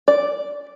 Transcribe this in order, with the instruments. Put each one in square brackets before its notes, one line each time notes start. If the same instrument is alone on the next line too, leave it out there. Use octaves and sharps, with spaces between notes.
[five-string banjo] D5